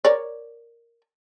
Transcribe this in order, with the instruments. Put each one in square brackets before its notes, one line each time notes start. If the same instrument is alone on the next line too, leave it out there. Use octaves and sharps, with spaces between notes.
[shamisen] A#4 C#5 D5